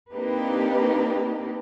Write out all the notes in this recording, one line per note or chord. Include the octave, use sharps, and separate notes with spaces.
A#3 C4 D4 D#4 G4 B4